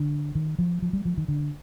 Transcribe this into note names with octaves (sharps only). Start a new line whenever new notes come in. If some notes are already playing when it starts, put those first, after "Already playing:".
Already playing: D3
D#3
F3
F3
G3
F3
D#3
D3